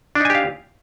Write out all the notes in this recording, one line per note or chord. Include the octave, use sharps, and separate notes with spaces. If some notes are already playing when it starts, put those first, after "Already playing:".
D4 D#4 G4 F5 G#5